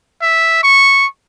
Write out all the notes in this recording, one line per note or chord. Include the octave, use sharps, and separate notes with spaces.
E5
C#6